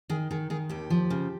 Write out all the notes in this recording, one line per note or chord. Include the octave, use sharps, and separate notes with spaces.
D#3 G#4
D#3 G#4
D#3 G#4
D#2 G4
F3
C#3